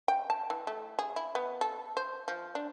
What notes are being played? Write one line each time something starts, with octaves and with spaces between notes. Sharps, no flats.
G5
A5
E3
A3
G#4
E4
B3
A4
C5
F3
D4